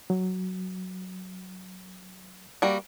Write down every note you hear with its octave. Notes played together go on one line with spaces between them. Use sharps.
F#3
G3 A#3 F#4